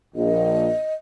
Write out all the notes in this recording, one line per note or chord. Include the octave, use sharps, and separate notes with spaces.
A#1 D#5